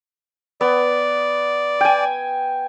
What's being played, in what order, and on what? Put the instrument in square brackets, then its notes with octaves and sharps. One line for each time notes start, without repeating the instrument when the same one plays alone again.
[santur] B3 [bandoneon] D5
[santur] G5 G#5